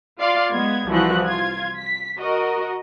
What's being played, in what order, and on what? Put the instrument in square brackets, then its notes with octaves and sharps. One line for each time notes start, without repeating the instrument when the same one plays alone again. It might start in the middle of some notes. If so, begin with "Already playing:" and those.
[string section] F4 D5 F5 C6
G#3 B3 G#6
C2 E3 F3 F#4 F#6
F4 G#6
B6
F#4 A#4 D#5